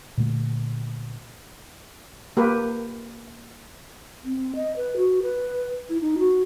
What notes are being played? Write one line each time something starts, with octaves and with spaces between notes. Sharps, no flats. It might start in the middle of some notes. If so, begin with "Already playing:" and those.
A#2 D3 A3
A#3 G4 B4
C4
D#5
B4
F#4
B4
E4
D#4
F#4